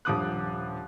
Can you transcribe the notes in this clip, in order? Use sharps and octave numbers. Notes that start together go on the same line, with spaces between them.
D#1 G2 F3 D6 D#6 F#6